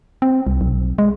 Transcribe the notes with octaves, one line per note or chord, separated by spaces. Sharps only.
C4
C2
B1
G#3